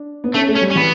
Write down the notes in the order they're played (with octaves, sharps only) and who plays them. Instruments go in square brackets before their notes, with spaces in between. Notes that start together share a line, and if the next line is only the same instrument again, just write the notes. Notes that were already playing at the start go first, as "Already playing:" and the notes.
Already playing: [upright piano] D4
B3
[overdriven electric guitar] A3 [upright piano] C#4
[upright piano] A3
[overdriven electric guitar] C#4
[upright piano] G3
[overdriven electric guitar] C#4
[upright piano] E3 [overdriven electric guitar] B3